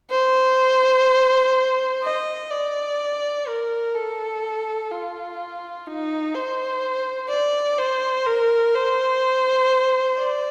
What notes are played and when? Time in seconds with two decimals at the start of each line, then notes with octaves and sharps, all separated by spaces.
0.11 C5
2.03 D#5
2.51 D5
3.47 A#4
3.94 A4
4.91 F4
5.87 D#4
6.34 C5
7.30 D5
7.78 C5
8.26 A#4
8.74 C5
10.18 D5